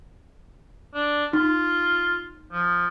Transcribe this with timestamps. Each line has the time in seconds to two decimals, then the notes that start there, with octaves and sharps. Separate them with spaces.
0.94 D4
1.33 D#4 F4
2.52 F3